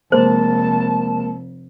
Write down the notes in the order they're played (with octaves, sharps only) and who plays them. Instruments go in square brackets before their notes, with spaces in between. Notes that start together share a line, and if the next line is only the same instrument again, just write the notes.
[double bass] F1 [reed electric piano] G#3 A#3 A#4 [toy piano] C5 [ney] A5